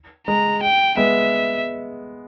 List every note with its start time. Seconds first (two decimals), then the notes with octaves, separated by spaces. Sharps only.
0.27 G#3 A#5
0.62 G5
0.97 G#3 B3 E5